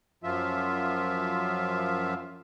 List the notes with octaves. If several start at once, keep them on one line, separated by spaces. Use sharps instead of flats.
F#2 F3 F4 E5